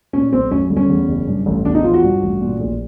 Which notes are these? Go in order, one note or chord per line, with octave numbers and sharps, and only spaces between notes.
A#2 C#4
B1 C4
F#2 C#4
G1
C#4
E2
F#1
G2
A1
E2 D4
D#4
F3 F4
F#4
G2
A1
A#2
A#1